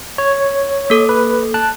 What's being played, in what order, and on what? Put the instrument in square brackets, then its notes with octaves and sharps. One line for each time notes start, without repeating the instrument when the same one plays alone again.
[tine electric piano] C#5
[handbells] A#3 A4 D#6
[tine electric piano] B4
A5 F#6